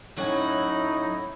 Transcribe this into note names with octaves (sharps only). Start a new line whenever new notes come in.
A2 F#3 C#4 D#4 E4 F#4 G#5